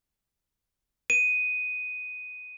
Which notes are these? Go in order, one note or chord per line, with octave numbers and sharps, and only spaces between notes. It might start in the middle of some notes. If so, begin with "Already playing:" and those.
D#7